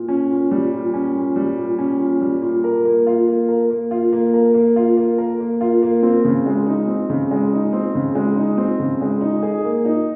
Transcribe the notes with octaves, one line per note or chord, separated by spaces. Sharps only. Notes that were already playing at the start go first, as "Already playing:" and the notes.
Already playing: A#2
C#4
A#2
G3
A#2
C#4
A#2
G3
A#2
C#4
A#2
G3
A#2
A#4
A#3
F4
A#3
A#4
A#3
F4
A#3
A#4
A#3
F4
A#3
A#4
A#3
F4
A#3
C4
C#3
G#3
D#4
C4
C#3
G#3
D#4
C4
C#3
G#3
D#4
C4
C#3
G#3
D#4
G#4
A#3
D#4